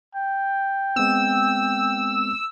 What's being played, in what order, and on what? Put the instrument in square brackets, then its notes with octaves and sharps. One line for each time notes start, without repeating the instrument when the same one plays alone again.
[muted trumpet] G5
[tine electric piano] G#3 B3 C4 [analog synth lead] E6